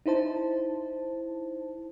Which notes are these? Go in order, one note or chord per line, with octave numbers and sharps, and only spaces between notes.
D#4 E4 C5 A5